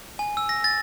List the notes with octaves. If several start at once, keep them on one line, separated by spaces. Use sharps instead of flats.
G#5
E6
A#6
A6